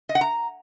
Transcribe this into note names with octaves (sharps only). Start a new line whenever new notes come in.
D#5
F#5
A#5